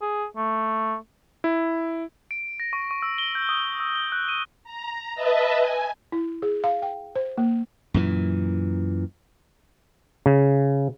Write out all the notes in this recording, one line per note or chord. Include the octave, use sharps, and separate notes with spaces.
G#4
A3
E4
D7
A#6
C#6
C#6
E6
G7
G6
D#6
E6
G7
F#6
D#7
A#5
B4 D#5 E5 A5
G#5
E4
G#4
F5
G5
C5
A#3
F#2 A#2 E3
C#3